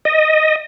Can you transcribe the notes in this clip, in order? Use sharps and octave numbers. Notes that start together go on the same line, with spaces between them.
D#5